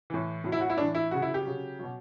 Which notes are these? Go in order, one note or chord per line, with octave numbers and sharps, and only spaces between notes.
A2 E3
A2 F#3
E4
F#4
E4
A2 E3 D4
E4
C#3 F#3 F#4
E4
G4
C#3 F#3
B2 F#3